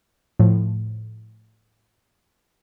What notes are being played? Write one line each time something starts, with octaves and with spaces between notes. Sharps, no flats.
A2 F3